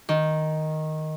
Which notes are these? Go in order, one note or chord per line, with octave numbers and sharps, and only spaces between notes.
D#3